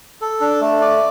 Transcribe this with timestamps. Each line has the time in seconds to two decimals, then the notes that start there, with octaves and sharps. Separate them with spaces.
0.21 A4
0.41 D4
0.61 A3
0.81 D5